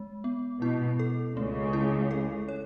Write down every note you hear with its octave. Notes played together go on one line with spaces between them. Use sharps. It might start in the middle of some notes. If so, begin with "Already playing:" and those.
Already playing: G#3
B3
B2 E4
A4
C#2 C#3 A3
E4
A4
C#5